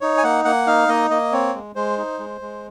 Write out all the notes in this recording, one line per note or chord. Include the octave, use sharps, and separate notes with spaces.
D#4 C#5
G#5
A#3 F#5
A#3 F#5
D#4 F5
A#3 D#5
A#3 D#5
C4 C#5
G#3
G#3 C5
D#4
G#3
G#3